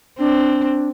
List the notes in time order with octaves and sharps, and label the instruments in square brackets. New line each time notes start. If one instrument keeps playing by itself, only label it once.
[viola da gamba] C4 [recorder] D4